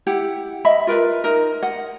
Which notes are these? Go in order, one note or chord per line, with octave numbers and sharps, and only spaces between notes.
E4 G4 F#5
D#5 E5 B5
F4 A#4 B4 E5
D#4 A#4
D#5 F#5